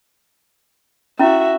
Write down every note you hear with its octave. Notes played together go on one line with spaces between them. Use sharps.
C#4 E4 F#4 E5